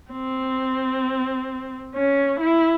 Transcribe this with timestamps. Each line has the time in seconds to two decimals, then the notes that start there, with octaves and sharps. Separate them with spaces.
0.12 C4
1.95 C#4
2.40 E4